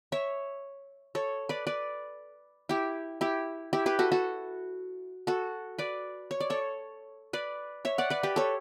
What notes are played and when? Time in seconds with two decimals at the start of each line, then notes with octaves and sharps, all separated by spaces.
0.12 C#5 E5
1.15 A4 C#5
1.49 B4 D5
1.67 B4 D5
2.69 E4 G4
3.21 E4 G4
3.73 E4 G4
3.86 G4 B4
3.99 F#4 A4
4.12 F#4 A4
5.27 F#4 A4
5.78 B4 D5
6.31 C#5
6.40 D5
6.50 A4 C#5
7.33 B4 D5
7.85 C#5 E5
7.98 D5 F#5
8.10 B4 D5
8.23 G4 B4
8.36 A4 C#5